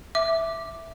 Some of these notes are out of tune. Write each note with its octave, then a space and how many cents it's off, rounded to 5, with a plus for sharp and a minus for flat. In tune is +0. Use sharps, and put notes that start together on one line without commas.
E5 +0 D6 +0